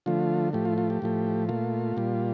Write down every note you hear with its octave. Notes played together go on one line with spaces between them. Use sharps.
D3 F3 A3 F4
A2 F3 A3 G4
F4
F4
G4
A2 F3 A3
A#2 A3 F4
A#2 G3